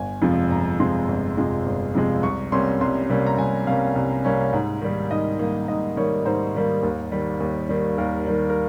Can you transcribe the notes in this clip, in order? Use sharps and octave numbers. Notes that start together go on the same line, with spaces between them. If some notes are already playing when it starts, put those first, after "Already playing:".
Already playing: G1 G#5
F2 C3 F3 G#3
G1 A#5
F2 C3 F3 G#3 C6
G1
F2 C3 F3 G#3
G1
F2 C3 F3 G#3
C2 C#6
C3 G3 A#3 C#4 C6
C2 C6
C3 G3 A#3 C#4
A#5
C2 G#5
C3 G3 A#3 C#4 F5
C2
C3 G3 A#3 C#4
G#2
D#3 G3 A#3
G#2 D#5
D#3 G3 A#3
G#2 D#5
D#3 G3 A#3 C#5
G#2 C5
D#3 G3 A#3
D#2
D#3 G3
D#2
D#3 G3
D#2 A#4
D#3 G3
A#4